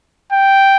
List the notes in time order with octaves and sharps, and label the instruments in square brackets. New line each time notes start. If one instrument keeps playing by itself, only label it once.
[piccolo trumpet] G5